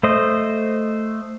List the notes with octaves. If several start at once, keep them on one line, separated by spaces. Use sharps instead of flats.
A3 C5 D#5